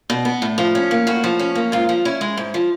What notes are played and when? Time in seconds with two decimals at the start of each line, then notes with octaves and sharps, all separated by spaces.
0.10 B2
0.25 B3
0.42 A2
0.58 F3
0.75 C#4
0.91 A#3
1.07 A2 F#4
1.24 F3
1.39 C#4
1.55 A#3
1.72 G#2 F4
1.89 F3
2.05 C#4 E4
2.21 G#3
2.37 G#2
2.54 F3